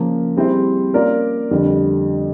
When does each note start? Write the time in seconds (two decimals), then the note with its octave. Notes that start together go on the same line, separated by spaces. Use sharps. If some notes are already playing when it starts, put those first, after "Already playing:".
Already playing: C#3 F3 A#3
0.36 G3 C4 E4 G#4 C5
0.94 A#3 C#4 F4 A#4 D5
1.51 F2 D3 G3